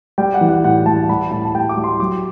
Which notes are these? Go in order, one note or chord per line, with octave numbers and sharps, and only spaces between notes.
G3 G5
F#5
E3
F#5
A2 F#5
G3 A5
G3 B5
A2 A5
A5
G3 G5
D6
G3
C6
F#3 D6